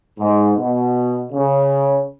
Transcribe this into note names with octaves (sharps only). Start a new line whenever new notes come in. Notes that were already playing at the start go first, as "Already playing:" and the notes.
G#2
B2
C#3